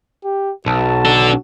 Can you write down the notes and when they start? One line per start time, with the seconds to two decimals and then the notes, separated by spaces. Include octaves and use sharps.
0.24 G4
0.67 B1 F#4 A5
1.05 D4 A4